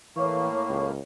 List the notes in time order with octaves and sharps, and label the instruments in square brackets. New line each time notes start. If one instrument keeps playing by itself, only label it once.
[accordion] A2 A#3 [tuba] E3 [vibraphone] C#5 C#6
[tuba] C#2